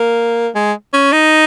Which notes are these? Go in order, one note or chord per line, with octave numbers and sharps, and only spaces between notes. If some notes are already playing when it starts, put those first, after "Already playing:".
Already playing: A#3
G#3
C#4
D#4